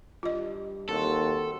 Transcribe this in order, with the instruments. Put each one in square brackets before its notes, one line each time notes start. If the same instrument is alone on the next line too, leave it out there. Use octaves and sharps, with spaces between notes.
[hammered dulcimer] G2 [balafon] F4 D#5
[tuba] D#2 [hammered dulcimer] C4 F#4 [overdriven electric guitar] A4